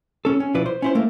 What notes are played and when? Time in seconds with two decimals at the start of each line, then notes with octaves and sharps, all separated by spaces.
0.25 C#4 A4
0.40 C#4
0.54 B1 F3 E4 B4 D5
0.66 C5
0.82 C#4 E4 C5
0.95 A3 A#3